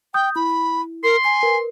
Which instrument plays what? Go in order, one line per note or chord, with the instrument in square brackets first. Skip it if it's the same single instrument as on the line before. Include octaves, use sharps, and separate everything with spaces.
[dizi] G5 [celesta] D#6 G6
[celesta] E4 [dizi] B5
[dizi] A#4 [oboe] C6
[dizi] G#5 [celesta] C7
[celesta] A#4 B4